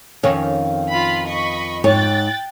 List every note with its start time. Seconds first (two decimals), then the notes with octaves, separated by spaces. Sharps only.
0.23 F2 D#3 C#4 C#5
0.91 F4 B5
1.27 D#5 B5 C#6
1.84 G#2 C#5 G5 G#5 F#6 A6